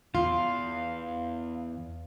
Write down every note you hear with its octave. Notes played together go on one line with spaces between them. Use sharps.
E2 F4 F5